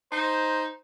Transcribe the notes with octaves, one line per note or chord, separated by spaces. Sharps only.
D#4 C5